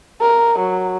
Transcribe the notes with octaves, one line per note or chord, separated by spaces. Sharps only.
A#4
F#3